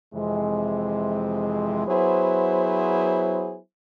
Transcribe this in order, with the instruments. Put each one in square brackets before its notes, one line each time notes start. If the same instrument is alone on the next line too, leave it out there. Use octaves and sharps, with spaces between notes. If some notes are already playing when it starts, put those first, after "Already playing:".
[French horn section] F2 C3 E3 G#3
F#3 B3 E4 G#4 C5